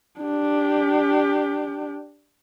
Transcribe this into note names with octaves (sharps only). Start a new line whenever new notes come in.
D4 G4